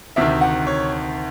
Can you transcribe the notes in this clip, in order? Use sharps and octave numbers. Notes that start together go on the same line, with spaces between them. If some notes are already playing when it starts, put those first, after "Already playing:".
D2 C3 D#3 E5
F#5
C#5